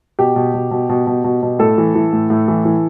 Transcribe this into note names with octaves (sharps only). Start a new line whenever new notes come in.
B2 G4
B2
B2
B2
B2
B2
B2
B2
A2 A4
E3
E3
A2
A2
E3
E3